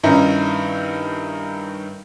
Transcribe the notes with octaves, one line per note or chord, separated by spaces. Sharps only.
G2 D#3 C#4 D#4 E4